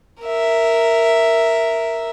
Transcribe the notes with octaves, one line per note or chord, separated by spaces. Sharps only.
A#4 E5